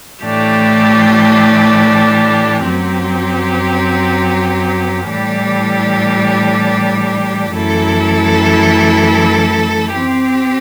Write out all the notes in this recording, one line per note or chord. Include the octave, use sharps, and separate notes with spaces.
A2 E3 A3 D4 G4
F#2 F#3 C4 G4
A2 E3 G3 D4 G4
F#2 E3 A3 E4 A4
C4 G4